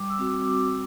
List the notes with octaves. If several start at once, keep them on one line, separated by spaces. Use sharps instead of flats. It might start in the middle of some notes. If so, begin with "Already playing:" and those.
Already playing: G3 D6
E6
C4 F#4
D6